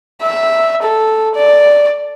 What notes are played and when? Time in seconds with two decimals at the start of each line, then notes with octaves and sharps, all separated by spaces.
0.22 E5
0.83 A4
1.36 D5